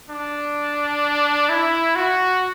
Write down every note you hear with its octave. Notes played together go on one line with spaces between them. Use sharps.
D4
E4
F#4